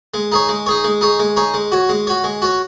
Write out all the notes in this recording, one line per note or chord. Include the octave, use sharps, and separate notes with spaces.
G#3
D#4 G#4 C#5
G#3
D#4 G#4 C#5
G#3
D#4 G#4 C#5
G#3
D#4 G#4 C#5
G#3
F#4 C#5
G#3
F#4 C#5
G#3
F#4 C#5